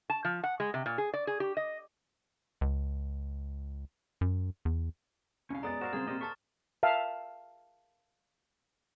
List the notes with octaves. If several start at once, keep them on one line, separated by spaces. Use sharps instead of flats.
A5
F3
F#5
G#3
C3
A#2
G#4
D5
G#4
G4
D#5
C#2
F#2
E2
C2 C#4 F5
F#2 G#3 B3 D5 A#5 D#6 A6
F#4 A#4 C5 F5 C#6 E7
C#3 G3 C4 G#4 C5 F6
A#2 C4 G4 D5 D#5
A4 A5 C#6 F6 A6 B6
E5 F5 A5